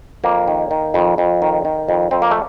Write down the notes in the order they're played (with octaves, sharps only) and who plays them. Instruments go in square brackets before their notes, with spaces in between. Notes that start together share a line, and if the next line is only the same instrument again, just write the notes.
[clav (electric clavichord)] F2 A#3
D#3
D#3
F2
F2
D#3
D#3
F2
F2 C4
A#3
A3